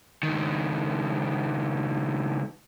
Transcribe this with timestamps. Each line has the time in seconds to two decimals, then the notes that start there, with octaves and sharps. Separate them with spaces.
0.23 C#2 D#3